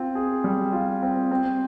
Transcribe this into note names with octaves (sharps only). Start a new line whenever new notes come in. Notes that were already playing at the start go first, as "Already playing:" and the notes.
Already playing: C4 F4
G#4
G3
F4
C4
C4